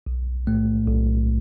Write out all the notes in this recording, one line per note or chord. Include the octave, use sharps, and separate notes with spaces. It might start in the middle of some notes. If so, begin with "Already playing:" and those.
B1
A2 A3
B1